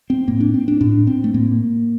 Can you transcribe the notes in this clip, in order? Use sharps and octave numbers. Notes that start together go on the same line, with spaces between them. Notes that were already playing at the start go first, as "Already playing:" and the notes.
C4
A2 A#3
D4
C4
D4
A2 D4
C4
A3
A2 A#3